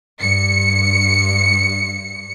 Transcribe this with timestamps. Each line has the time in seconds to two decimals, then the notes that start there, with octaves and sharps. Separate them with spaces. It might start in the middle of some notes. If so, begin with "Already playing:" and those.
0.21 G2 C#7